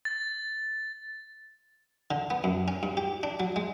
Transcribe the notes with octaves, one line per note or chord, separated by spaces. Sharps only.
A6
D3
B3
F#2
C#4
G2
G4
D4
F#3
G#3